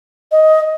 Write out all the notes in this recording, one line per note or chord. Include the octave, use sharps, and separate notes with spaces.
D#5